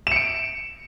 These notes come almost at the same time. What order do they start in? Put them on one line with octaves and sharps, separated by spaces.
E7 C#7 D7